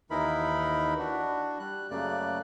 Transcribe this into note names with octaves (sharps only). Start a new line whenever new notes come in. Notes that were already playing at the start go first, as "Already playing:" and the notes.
D#2 E3 D#4 E4 A#4 B5
D4 F#4
G3 F#6
F#2 C#3 A3 A#3 D5 F#6